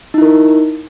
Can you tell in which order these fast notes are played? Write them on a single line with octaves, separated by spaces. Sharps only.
D#4 E4 A#4